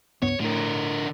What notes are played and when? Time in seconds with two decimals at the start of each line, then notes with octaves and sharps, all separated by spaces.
0.22 C#2 G2 B3 C#5
0.40 A2 D3 A#4